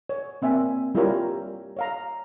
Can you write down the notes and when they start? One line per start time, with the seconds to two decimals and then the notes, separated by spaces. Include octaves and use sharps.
0.09 C#5
0.42 A#3 C4 E5 G#5
0.95 G3 E4 F4 G4 A#4 C#5
1.77 C#5 F5 A#5